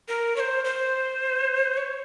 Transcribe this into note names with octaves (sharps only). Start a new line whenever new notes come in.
A#4
C#5
C5
C5
C#5